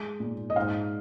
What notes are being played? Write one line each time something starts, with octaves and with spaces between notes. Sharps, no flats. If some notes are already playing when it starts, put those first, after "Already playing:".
Already playing: G#3
A#2
D#5
G#2 F5